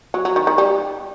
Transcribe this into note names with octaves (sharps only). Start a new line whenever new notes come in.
F#3
F#3
D#3
D#3
G3